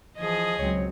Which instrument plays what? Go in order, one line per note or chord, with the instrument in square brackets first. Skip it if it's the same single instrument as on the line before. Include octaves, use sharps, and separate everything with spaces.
[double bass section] E3 [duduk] F3 [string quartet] G#4 D#5
[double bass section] C#2 F#3 C4 [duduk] C#5